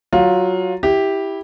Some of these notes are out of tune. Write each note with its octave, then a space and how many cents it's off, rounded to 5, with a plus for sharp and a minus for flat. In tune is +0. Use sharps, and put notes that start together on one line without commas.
F#3 +10 F4 +20
E4 -10 G4 +0